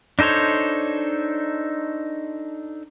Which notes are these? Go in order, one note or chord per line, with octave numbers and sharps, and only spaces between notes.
D4 D#4 A4 C5 C#5